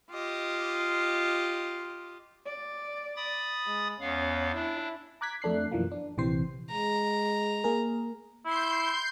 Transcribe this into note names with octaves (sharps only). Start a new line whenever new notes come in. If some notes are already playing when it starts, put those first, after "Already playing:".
F4 G4 D#5
D5
B5 D#6 A6
G#3
E2 B3 C#4 F5
D4 E4
A#5 D6 F#6 G#6 B6
F2 A3 D4 F#6 C7
F#2 B2 E3 F3 A#3
D4
A#1 C3 E3 C4 C5 C7
G#3 A#5
A#3 G#4 A#4
E4 C6 G6